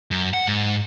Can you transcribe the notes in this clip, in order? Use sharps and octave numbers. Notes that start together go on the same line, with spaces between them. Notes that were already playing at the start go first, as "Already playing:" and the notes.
F#2
F#5
G#2